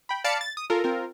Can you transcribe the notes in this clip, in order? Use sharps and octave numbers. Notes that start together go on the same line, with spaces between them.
G5 B5
D5 F5 A5 B5 C#7 D7
A6
D#6
F4 A4 A#4
C4 F4 A#4